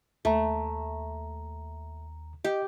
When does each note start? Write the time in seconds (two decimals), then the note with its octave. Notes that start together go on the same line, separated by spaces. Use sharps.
0.25 D#2 A3 A#5
2.45 G4 D#5